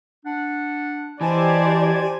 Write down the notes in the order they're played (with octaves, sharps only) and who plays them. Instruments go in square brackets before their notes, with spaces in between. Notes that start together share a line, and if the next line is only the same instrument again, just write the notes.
[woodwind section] D4 F#5
[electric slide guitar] E3 [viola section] G4 C5 D5 [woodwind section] D#5 A5 [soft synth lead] G#5